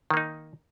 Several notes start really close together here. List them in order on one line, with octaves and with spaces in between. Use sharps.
D#3 A#3 D#4